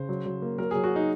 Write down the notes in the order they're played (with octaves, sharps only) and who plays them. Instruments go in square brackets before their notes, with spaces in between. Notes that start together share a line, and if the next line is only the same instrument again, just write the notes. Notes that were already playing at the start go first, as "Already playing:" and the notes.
Already playing: [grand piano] C#3 C5
F#3
F#3
A#3
F#3 A#4
F#3 G#4
F#4
D#4